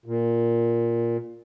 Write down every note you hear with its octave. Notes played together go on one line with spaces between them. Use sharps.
A#2